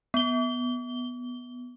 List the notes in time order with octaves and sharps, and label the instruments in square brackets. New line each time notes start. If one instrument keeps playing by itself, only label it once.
[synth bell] B3 G7